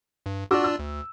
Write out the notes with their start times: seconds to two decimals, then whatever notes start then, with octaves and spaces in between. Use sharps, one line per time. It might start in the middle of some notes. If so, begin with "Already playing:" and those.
0.26 G2
0.51 D4 F4 F#4 D5 D6 E6
0.64 E6
0.79 D2